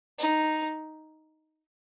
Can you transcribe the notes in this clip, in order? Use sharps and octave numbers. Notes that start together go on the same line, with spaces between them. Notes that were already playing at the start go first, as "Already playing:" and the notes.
D#4